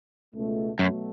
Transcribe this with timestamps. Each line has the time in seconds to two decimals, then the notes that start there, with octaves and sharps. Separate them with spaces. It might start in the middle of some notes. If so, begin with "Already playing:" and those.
0.34 C#2 B2 A3
0.79 F#2 B2 F#3 A3